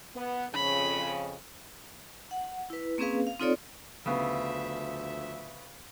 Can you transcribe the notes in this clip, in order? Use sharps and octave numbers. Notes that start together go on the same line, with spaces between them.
B3
F2 C#3 B5
F#5
E4 B4
A#3 C4 C#4 G#4 B4 F5
F5
C4 D#4 F4 A4 C#5 D5
D2 C#3 F3 B3 E5